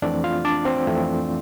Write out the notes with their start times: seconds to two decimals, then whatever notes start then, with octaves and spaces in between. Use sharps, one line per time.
0.02 F2 E3 A3 C4 D4 D5
0.24 F4 F5
0.45 D4 D5
0.65 C4 C5
0.87 F2 E3 A3 C4